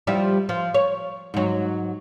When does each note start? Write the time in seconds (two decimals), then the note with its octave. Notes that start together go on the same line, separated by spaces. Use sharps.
0.07 F3 G3 E4
0.49 F3
0.74 C#5
1.34 G#2 F#3